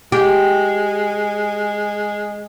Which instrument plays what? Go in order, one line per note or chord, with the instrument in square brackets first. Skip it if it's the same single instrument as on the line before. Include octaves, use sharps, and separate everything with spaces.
[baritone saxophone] G#3 [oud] G4